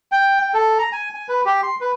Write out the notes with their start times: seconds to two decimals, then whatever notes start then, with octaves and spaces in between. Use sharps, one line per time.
0.12 G5
0.40 G5
0.54 A4
0.79 A#5
0.92 G#5
1.14 G#5
1.28 B4
1.45 G4
1.63 C6
1.81 B4